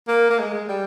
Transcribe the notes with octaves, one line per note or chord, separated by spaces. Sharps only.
A#3
A#3
G#3
G#3
G3